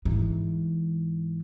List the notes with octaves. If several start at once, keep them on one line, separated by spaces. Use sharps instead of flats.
G#2 E3